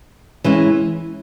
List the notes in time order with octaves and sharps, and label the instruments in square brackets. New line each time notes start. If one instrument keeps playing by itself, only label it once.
[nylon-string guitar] E3 G#3 C#4